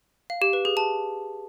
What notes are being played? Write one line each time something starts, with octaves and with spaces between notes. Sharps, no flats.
F5
G4
B4
G#4
A5